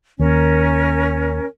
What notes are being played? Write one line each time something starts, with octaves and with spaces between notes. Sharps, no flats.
D#2 C#4 A#4